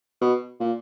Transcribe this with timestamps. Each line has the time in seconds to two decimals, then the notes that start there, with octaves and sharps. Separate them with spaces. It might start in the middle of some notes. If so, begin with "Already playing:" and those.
0.21 B2
0.60 A#2